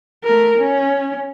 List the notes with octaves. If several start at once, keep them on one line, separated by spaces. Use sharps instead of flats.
A3 A#4
C#4